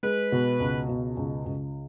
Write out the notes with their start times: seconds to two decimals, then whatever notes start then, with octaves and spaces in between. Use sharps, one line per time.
0.03 G#3 B4
0.32 B2
0.60 C#2
0.89 B2
1.17 C#2
1.46 C#2